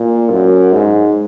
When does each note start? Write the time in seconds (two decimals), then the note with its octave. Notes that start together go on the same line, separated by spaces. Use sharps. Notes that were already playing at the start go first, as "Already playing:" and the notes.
Already playing: A#2
0.31 F#2
0.73 G#2